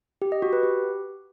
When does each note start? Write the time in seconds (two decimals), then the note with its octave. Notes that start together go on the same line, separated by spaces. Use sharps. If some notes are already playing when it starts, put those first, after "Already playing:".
0.22 G4
0.32 D#5
0.42 F#4
0.53 B4
0.63 G4